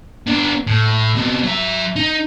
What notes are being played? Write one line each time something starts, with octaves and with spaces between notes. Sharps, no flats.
B3 D4
A2
C3 B3
F#3 E5
D#4